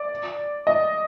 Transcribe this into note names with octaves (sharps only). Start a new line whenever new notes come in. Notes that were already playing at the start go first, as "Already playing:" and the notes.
Already playing: D5
D#5